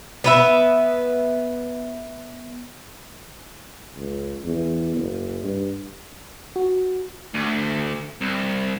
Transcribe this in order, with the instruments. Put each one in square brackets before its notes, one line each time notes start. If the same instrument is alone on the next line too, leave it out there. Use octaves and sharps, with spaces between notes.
[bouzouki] B3 B4 E5
[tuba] C#2
E2
F#1
G2
[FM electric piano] F#4
[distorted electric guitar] D2
C2